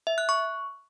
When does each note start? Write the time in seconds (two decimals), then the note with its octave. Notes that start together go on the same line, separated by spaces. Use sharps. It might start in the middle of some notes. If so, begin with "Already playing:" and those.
0.07 E5
0.18 F#6
0.29 C#6